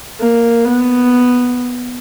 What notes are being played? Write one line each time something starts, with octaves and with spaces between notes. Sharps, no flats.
A#3
B3